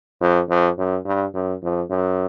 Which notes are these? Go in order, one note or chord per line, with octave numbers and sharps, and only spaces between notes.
F2
F2
F#2
G2
F#2
F2
F#2